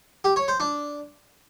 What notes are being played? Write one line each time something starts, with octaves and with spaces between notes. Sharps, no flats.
G4
C#5
C5
D4